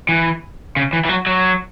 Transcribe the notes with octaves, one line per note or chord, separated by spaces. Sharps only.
E3
C#3
E3
E3
F#3
F#3